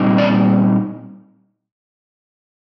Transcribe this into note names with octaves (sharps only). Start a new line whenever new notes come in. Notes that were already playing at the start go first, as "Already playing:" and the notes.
Already playing: A#2 G3 C4 D#4
D5